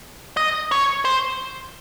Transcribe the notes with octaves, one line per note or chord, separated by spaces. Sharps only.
D#5
C#5
C5